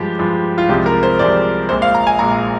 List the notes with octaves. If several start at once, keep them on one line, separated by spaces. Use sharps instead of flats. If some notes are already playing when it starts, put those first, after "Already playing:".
Already playing: G2 F3 G#3 G4
G2 F3 G#3
F4
C2 C3 F3 G#3 G4
A#4
C5
C2 C3 F3 G#3 D5
A#1 A#2 G#3 C5
F5
A#5
G#5
A#1 A#2 G#3 A#5